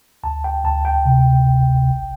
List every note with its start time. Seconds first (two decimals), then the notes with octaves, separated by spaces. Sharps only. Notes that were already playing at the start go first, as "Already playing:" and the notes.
0.23 D2 A5
0.44 G5
0.65 D2 A5
0.85 G5
1.05 C3
1.46 G1
1.88 A#1